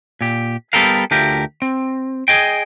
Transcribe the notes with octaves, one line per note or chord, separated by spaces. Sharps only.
A#2 G4
G3 B3 G4 A4 A#4 F5
D2 A3 F4 G4 A#4
C4
G#4 D#5 G5